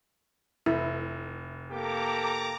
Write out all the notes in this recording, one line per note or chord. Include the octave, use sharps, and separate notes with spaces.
F1 E4
A#3 G4 A4 A#5 D6